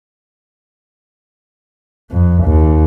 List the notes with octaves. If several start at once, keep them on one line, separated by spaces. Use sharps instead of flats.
F2
D#2